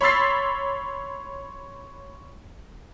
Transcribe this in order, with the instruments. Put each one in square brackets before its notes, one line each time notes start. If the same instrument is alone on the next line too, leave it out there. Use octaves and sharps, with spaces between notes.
[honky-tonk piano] C#5 B5 C6 E6 A6 C7